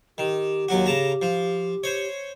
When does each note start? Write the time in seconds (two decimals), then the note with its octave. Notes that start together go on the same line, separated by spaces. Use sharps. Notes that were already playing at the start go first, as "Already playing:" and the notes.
0.18 D#3 G4
0.69 D#2 F#3 F#4
0.86 C#3 A5 A#5
1.22 F3
1.84 C5 C#5